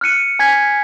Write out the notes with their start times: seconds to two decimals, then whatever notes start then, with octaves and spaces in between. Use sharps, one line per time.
0.01 F6 F#6 C#7 D#7
0.39 G#5 G#6 B6